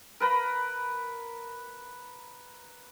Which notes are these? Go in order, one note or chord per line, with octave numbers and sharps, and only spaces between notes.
A#4 B4 A#5 B5